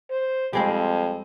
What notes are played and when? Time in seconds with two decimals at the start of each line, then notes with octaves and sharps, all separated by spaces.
0.10 C5
0.53 F2 G3 G#3 C4